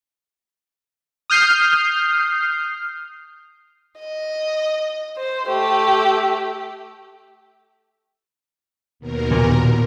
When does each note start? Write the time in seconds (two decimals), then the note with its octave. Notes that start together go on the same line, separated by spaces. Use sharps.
1.30 D#6 F6 G6 C7
3.99 D#5
5.17 C5
5.47 A3 G4
8.99 D#2 B2 A#4
9.31 A#2